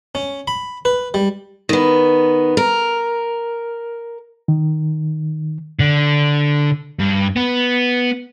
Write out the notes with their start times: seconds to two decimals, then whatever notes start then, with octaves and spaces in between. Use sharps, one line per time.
0.15 C#4
0.48 B5
0.85 B4
1.14 G3
1.69 D#3 B3
2.57 A#4
4.48 D#3
5.79 D3
6.99 G2
7.36 B3